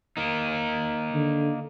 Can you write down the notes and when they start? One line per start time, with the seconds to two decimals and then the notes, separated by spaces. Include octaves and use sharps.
0.17 A#3 D#4
1.13 D3